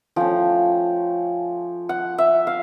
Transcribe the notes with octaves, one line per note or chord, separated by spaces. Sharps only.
F3 A3 C#4 G5
F#5
E5
F5